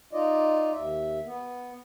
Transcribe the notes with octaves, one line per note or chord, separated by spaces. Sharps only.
D#4 F4 D5 D#5
D#2 E5
B3